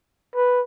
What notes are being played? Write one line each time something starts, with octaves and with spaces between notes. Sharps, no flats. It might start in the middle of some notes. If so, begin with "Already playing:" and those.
B4